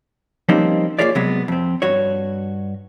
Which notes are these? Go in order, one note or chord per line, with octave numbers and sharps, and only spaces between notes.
F3 G3 A#3 C4 C#4 D#4
A#3 B3 F4 G#4 C#5 D5
C3 F#3 G#3 B3
F2 C4
G2 F#4 C#5